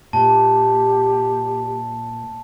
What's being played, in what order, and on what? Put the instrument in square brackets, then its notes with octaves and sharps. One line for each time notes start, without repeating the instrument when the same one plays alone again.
[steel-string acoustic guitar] A#2 [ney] G4 [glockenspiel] A5